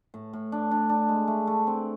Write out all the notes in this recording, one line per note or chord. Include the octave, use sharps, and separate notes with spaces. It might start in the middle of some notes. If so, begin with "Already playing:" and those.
A2
A2
D4
D4
D4
G#3
A3
A3
C4